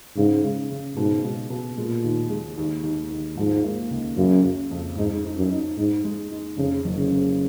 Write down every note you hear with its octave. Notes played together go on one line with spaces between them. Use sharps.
G#2 C#3
C#3
C#3
G#2 B2
B2
B2
A#2 G#3
D#2
G#3
D#2
D#2
D#2
G#2 F3
A#3
C#2
F#2 C#3
C#3
F2
G#2 D#4
D#4
F#2
D#4
G#2 D#4
G#3
D#4
F2 C#3
F#1
C#3
F#1